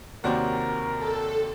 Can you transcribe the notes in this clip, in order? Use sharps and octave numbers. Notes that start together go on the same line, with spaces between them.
D#2 C3 C4 F#4 A#4 C#5 D5
A4